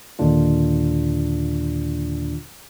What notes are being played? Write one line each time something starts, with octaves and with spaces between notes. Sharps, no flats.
D#2 A#2 D3 D4 F4